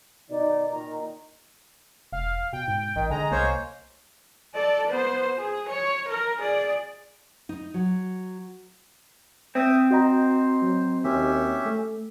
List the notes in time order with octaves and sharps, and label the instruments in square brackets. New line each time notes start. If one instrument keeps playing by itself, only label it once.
[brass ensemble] B2 D#3 D#4 [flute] D5
[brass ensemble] A#2 D#3 [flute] A#5
[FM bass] E1 [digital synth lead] F5
[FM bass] B2 [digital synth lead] G5
[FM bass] G#2
[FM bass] A1 [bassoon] D#3
[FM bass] D3 [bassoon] G#3 [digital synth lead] A#5
[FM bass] C2 [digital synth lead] A#3 [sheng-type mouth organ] C5 C#5
[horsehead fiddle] A4 D5
B3 C5
G#4
C#5
A#4
G#4 D5
[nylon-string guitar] D#4
F#3
[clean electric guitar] C4 [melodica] E5 D#6
[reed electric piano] F#4 D#5 A#5 [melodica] C5
[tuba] F#3
[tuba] D#2 [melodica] C#4 G4 E5
[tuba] A3